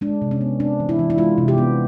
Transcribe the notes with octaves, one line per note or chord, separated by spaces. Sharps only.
G#3 D4
C3
C#4
B3
C4 D4
E3
E4
E3
E4
G#3 F4
C3
G4
B3